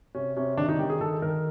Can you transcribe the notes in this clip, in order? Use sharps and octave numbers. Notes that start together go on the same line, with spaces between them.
C3 C#4
C3 C#4
D#3 D4
D#4
D#3 G4
G#4
D#3 A4
D#3 A#4